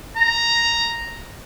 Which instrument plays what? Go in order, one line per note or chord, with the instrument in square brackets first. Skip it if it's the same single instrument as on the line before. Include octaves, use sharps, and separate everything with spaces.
[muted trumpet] A#5